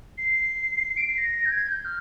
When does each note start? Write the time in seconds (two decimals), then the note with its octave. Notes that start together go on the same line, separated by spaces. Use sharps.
0.18 C7
0.97 D7
1.07 C7
1.18 A#6
1.46 G6
1.52 G#6
1.68 G6
1.85 F6